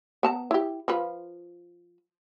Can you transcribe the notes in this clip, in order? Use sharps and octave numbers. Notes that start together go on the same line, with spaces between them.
B3 A5 A#5
E4 G4
F3 F4 B4